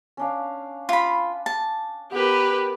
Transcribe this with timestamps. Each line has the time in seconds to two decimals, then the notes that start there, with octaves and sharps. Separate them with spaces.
0.17 C#4 D4 F5
0.89 F4 B5
1.46 A5
2.12 B3 G4 A#4 B4